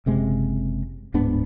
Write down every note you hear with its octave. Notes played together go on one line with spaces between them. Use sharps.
F#1 C3 G#3
D1 G#2 B3 D4